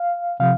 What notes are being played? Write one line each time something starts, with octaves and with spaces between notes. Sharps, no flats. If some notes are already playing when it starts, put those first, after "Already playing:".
Already playing: F5
C3 F3 F5